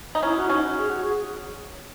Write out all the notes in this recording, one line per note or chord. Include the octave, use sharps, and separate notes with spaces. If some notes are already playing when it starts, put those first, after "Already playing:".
D#4
C#4 E4
F#4
C#4 D#4
F#4
G#4
F#4
G#4